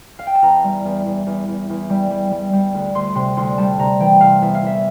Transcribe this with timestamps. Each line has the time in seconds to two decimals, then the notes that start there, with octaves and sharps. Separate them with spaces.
0.19 F5
0.27 G5
0.35 A5
0.42 E2 A#5
0.64 G3
0.85 E2
1.06 E2
1.27 E2
1.48 E2
1.69 E2
1.90 G3
2.11 G3
2.31 G3
2.53 G3
2.74 D2
2.95 D2 C6
3.15 C3 C6
3.37 D2 C6
3.58 G3 A5
3.79 C3 A#5
4.00 E3 G5
4.21 C3 F5
4.42 E2 E5
4.55 F5
4.63 E2 E5